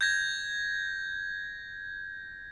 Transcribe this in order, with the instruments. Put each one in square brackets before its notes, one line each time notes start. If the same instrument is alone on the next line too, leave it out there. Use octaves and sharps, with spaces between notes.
[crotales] G6 G#6 A#6